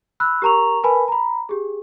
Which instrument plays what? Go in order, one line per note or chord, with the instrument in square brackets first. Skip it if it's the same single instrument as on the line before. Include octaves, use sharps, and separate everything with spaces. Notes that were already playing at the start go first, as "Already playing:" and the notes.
[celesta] B5 E6 F#6
G4 A#4 A#5 C#6 F7
A#4 B4 G#5 A5 B5
A#5 B5
G4 G#4